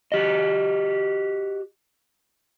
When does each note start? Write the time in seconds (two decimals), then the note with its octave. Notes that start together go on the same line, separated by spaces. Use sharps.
0.12 F#4 G4 D#5